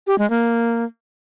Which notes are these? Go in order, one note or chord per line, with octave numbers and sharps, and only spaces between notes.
G4
G#3
A#3